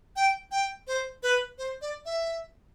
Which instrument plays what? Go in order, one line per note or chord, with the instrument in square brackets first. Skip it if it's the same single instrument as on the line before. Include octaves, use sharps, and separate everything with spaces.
[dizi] G5
G5
C5
B4
C5
D5
E5